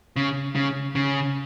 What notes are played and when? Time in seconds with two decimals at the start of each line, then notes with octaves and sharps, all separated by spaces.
0.16 C#3
0.55 C#3
0.95 C#3